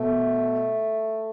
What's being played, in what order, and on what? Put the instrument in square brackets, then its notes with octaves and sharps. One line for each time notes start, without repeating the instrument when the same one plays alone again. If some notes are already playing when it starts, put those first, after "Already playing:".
Already playing: [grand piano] B2 [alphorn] A3